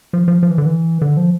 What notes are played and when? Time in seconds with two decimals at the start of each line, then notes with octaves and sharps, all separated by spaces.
0.13 F3
0.28 F3
0.43 F3
0.51 E3
0.58 D3
0.66 E3
1.01 D3
1.17 F3